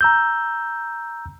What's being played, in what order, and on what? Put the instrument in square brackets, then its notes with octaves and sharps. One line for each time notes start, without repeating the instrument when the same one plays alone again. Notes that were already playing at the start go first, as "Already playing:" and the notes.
[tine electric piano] A#5 E6 G6